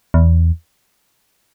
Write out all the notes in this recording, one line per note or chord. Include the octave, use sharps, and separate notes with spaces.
E2